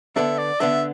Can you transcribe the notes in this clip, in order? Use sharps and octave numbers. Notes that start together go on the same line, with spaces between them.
D3 B3 D4 A4 E5
D5
D3 B3 D4 A4 E5